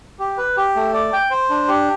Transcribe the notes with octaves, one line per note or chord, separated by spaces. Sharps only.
G4
B4
G4
A3
D5
G5
C5
D4
G4